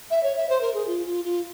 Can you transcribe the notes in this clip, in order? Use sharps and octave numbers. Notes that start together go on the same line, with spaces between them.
E5
C#5
E5
C5
A#4
G#4
F4
F4
F4